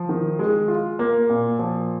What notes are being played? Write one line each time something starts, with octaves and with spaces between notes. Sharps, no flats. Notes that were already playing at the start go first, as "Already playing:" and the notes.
Already playing: F3
D#3
G#3
F4
A#3
A#2
F3